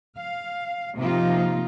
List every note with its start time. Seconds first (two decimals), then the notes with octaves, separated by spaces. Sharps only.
0.17 F5
0.97 C3 F3 A#3 D#4 F4